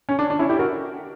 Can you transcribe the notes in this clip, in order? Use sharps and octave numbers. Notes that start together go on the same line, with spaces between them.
C#4
D4
D4
C#4 E4
E4 G4
F#4 A#4